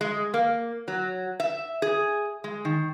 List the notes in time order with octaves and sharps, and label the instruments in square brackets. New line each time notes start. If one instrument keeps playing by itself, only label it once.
[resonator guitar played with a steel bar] G#3
A#3
F#3
E5
G#4
G#3
D#3